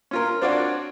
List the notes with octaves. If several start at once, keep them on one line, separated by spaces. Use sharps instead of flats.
C#4 F4 A#4
C4 D4 F4 F#4 C#5 D5